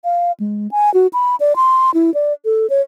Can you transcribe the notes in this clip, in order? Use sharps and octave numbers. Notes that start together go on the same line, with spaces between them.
F5
G#3
G#5
F#4
B5
D5
C6
E4
D5
A4
C#5